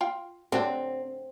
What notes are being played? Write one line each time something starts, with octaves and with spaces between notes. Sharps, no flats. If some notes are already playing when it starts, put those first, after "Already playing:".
F4 F5 G5
D3 F#3 C4 D4